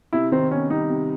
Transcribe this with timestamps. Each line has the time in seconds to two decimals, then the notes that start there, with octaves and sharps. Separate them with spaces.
0.13 C3 E4
0.32 D#3 C4
0.51 B3 C#4
0.70 G3 D#4
0.89 C3